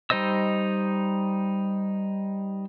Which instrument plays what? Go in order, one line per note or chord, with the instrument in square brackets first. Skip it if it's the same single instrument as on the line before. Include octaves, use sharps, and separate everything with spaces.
[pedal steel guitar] G3 D#4 C5 D#5 E6